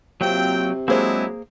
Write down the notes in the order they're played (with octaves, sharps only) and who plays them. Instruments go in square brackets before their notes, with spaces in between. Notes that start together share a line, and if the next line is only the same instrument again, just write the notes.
[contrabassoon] C3 [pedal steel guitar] F#3 A#3 C4 [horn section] F4 G5
[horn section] F#3 D4 E4 [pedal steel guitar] G#3 C4 [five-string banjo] A#3 G#4 C5